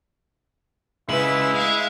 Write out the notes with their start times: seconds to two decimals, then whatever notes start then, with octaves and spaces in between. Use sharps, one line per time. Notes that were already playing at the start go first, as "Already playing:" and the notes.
1.09 C#3 G#3 E4 B4 E6 B6 F#7
1.54 G#3 E5 F5